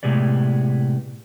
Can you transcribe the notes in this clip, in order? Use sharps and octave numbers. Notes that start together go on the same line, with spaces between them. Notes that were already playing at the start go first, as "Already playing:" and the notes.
A2 C3 G#3 B3 D5